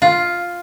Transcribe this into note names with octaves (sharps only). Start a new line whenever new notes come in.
F4